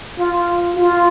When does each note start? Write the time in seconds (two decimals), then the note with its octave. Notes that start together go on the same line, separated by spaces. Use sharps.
0.18 F4
0.76 F4